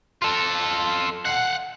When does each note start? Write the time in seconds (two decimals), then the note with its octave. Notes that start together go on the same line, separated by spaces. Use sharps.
0.22 F4 A4
1.25 F5 F#5